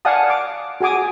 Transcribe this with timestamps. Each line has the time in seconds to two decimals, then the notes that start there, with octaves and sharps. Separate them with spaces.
0.05 D5 F5 F#5 G#5 A5 D#6
0.30 D6
0.81 F#4 G#4 G#5 D6 D#6